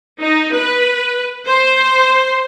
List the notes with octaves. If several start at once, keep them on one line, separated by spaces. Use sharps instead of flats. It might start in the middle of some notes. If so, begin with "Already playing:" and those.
D#4
B4
C5